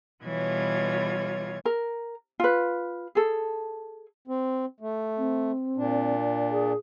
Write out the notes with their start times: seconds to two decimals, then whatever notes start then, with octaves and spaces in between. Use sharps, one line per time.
0.24 B2 E3 G3 F4 C#5 G#6
1.65 A#4
2.40 F4 B4
3.15 G#4 A4
4.27 C4
4.80 A3
5.18 C4
5.77 A#2 D4
6.51 G#4